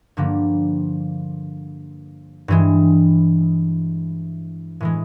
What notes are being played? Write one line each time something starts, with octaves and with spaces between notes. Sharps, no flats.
G2 D3 F3 A#3
G2 E3 G#3
A2 E3 G#3